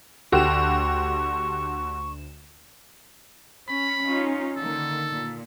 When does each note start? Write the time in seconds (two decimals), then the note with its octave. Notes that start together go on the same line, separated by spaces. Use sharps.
0.32 D2 D3 F#4 G4 C#6 E7
3.68 C#4 B5
4.04 C#4 D#4 F4
4.56 D3 D#3 A#3 A4
5.10 A#2